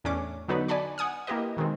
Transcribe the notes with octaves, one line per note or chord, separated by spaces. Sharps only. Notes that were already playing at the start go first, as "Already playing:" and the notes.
E2 A2 C#4 D4 D6
D3 F#3 B3 D#4 F#4 B4
D5 G#5 A5 B5 C#6
F#5 G#5 D#6 F6
A#3 E4 G4 B4 D#5
B2 D#3 G#3 C4